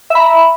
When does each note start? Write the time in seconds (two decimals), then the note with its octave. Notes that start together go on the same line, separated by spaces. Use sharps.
0.10 E5
0.15 B5
0.20 A#5